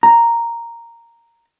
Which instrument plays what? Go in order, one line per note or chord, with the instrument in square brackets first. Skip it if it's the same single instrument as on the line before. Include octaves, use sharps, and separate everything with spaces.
[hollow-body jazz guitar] A#5